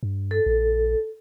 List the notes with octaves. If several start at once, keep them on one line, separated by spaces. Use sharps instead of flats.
G2
A4
A#1